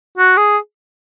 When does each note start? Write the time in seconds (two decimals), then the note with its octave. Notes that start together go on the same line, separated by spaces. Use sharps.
0.17 F#4
0.37 G#4